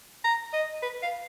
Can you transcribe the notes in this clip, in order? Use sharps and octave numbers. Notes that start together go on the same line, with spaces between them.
A#5
D#5
B4
F5